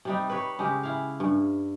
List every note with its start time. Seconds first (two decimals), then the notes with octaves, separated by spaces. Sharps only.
0.05 C3 G3 D#4
0.30 B4 C#5
0.59 C#3 G#3 G4
0.83 E4 F5
1.20 G2